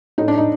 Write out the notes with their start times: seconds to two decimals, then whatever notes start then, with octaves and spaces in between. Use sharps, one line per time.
0.18 A2 D#4
0.28 D4
0.37 D#4